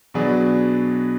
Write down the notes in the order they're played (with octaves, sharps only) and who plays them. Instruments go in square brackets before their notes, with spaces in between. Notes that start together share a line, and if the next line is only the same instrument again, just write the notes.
[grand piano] B2 F#3 B3 D4 G#4